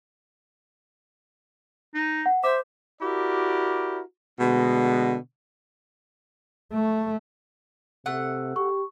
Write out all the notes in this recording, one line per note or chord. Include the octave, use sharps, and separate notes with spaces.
D#4
F#5
C5 E5 D6
E4 F#4 G4 A#4 D5
B2 D3 G#3 A3 B3
A3
C3 A3 F#5
G4 C#6